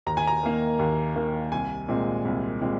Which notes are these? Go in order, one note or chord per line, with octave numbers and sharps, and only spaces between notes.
D#2 A#5
G#5
A#5
D#3 A#3
D#2
D#3 A#3
C2 G#5
A#2 G#3 C4
C2
A#2 G#3 C4